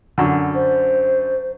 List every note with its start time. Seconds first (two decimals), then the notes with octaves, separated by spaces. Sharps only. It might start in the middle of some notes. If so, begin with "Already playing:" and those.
0.18 F#2 D3
0.54 C5